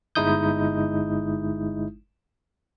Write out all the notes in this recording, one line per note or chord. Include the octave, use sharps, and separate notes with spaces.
G1 G#3 D#4 E4 D#6 G6